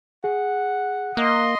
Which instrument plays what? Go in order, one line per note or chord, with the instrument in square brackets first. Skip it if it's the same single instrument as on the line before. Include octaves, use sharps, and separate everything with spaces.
[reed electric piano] G#4 [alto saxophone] F#5
[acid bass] A#3 [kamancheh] D#5 C6 [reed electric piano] F#6